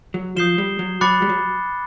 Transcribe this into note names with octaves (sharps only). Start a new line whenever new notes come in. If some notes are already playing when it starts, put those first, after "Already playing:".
F#3
F3 D#6 G6 C7 E7 G7
G3
F#3
F#3 B5 D6 F#6 A6 C#7
G3
F#3